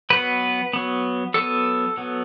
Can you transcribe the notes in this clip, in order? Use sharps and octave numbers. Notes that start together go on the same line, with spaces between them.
F#3 B3 B4
F#3 B3
F#3 B3 A4
F#3 B3